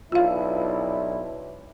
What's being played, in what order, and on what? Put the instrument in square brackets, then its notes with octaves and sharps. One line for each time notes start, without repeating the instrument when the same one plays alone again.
[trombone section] B1 D4 E4 [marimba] F4 F5